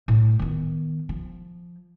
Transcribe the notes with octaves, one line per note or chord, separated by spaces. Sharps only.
A2
D#3 B3
F3